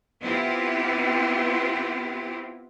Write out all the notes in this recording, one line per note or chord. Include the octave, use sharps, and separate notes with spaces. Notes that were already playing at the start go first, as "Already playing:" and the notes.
B3 C4 E4 F4 G4 B4